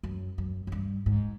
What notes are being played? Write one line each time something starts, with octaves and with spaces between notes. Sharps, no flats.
F#2
F#2
F#2
G2
G#2